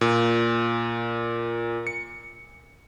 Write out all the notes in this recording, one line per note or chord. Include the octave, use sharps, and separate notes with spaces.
A#2
C#7